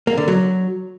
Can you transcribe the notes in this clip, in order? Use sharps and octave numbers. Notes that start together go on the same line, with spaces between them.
A#3
D3
F#3